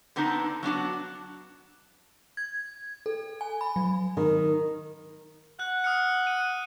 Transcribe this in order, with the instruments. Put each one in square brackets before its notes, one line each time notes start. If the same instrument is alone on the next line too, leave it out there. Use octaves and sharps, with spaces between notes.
[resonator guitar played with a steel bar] D3 B3 C4 D4 D#4
F#3 B3 D4 F#4
[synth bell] G#6
A4
G#5
B5
F#3
[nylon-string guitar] D#3
[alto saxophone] F#5 [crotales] F#6
[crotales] D#6 F6 C#7
D#7